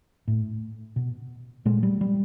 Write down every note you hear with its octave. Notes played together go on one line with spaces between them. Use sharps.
A2
B2
A#2 G#3
G3
G3